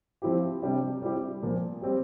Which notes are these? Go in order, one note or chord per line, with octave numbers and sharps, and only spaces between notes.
F3 C4 E4 G4
C3 G3 D4 G4
G3 C4 E4 G4
A#2 F3 A#3
G3 C4 G4